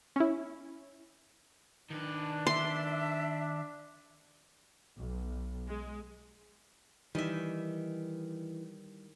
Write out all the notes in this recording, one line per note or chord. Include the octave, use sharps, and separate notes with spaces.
C#4 E4
D#3 D4 B4
E5 C6
B1
G#3
D#3 E3 G3 D#4 E5